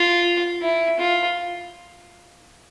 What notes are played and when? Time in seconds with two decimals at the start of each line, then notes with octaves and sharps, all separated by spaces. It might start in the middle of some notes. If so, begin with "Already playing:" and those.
Already playing: F4
0.62 E4
0.99 F4